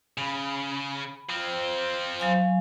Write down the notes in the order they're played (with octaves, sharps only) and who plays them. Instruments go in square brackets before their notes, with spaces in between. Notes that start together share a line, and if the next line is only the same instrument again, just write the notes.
[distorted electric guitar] C#3 [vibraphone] B5
[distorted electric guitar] F3 C4
[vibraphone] F#3 F5 G#5